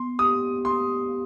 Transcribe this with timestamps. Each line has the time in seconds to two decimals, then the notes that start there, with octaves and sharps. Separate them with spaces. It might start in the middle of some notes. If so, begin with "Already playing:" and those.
Already playing: B3 C6
0.19 G4 D#6
0.65 G4 C6